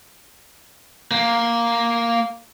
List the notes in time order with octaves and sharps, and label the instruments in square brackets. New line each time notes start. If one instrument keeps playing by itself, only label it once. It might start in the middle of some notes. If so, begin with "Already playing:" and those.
[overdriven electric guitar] A#3